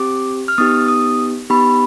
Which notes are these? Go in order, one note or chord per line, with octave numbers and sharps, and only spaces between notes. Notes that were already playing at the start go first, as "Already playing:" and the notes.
Already playing: C4 G4 D6
F6
B3 D#4 G4 D#6
D#6
B3 D#4 G4 B5